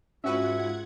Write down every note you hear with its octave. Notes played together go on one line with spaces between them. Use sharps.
G#2 C#4 F4 F#4 B4 E5 F#5 G#6